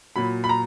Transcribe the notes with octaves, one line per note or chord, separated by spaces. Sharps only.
A#2 F#3 B5
B5
A#5